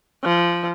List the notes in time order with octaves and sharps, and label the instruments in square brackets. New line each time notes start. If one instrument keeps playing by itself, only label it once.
[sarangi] F3